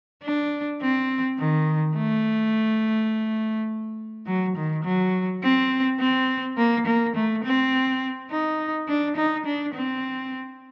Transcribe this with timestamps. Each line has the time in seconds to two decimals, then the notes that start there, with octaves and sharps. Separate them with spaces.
0.23 D4
0.81 C4
1.39 D#3
1.96 A3
4.27 F#3
4.56 D#3
4.84 F#3
5.42 C4
6.00 C4
6.57 A#3
6.86 A#3
7.15 A3
7.44 C4
8.30 D#4
8.88 D4
9.16 D#4
9.46 D4
9.74 C4